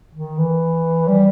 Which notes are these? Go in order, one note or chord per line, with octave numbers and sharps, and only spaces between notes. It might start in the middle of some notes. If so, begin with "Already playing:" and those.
D#3
E3
G3